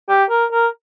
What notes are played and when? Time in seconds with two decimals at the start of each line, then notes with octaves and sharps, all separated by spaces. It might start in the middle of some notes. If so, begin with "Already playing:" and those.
0.09 G4
0.30 A#4
0.52 A#4